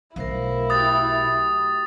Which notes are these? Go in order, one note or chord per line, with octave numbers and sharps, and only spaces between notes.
B1 A3 E4 A#4 C5 F5
F#4 G4 G5 D#6 A6